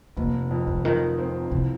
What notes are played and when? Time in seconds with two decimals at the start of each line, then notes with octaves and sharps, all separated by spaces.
0.17 F1 A#3
0.51 F2
0.67 G#3
0.80 C3
0.84 D#3 F3
1.18 C4
1.52 C2 C3